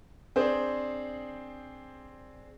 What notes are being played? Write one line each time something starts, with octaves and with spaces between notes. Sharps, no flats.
C4 D4 G#4 C5